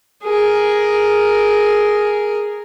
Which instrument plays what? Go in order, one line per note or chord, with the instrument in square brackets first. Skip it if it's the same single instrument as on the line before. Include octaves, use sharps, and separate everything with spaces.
[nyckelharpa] G#4 A#4